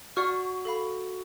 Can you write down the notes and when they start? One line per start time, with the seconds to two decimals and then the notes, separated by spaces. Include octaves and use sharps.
0.16 F#4 D5 F#5 C#6 F6
0.65 A4 F5 B5